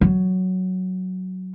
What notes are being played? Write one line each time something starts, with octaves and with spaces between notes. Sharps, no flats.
F#3